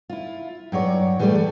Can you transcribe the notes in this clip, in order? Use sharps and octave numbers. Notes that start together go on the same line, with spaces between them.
E4 F4
G2 F#3 C#5 D5
E3 G3 A3 G4 D5
A4